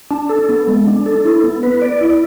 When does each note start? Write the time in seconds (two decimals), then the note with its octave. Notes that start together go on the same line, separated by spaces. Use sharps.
0.11 D4
0.29 A4
0.49 B3
0.67 G#3
0.87 D4
1.06 A4
1.25 E4
1.44 B3
1.63 B4
1.82 D5
2.01 E4